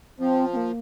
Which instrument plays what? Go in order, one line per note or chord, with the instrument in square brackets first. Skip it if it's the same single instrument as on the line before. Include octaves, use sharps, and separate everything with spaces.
[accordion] F3 [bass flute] C4
[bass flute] C4
A#3